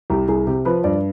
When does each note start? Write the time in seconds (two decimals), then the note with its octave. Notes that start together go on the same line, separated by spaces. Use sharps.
0.10 C2 G4
0.28 C2 G#4
0.47 C3 G4
0.65 F3 B4
0.84 G2 D5